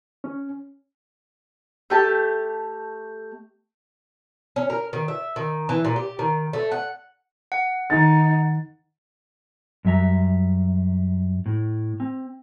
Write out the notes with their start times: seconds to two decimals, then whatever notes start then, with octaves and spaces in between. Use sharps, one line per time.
0.24 C#4
1.90 A3 G4 A5
4.56 C#4
4.70 A#4
4.93 D#3
5.08 E5
5.36 D#3
5.69 E3
5.85 A#2
5.96 G4
6.19 D#3
6.53 A3
6.71 F#5
7.52 F#5
7.90 D#3 D#4 A6
9.85 F#2 G3 E5 A#5
11.46 A2
12.00 C4